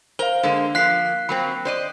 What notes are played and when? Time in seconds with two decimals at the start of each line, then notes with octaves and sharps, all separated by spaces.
0.19 A#4 C5 F5 A#5 G7
0.43 D3 G#3 A#3
0.75 F3 A#3 F5 F#6 B6 C7
1.29 F#3 A#3 C4 B5
1.65 C5 D5 D#5